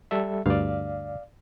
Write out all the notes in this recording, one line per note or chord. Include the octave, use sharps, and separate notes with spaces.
G3 A4 E5
D2 G2 D5 F5